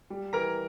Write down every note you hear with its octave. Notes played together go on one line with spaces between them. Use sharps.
G3
E3 A#4 A#5